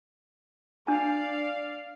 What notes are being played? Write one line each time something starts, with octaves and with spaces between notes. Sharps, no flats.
D4 D5 F5 A5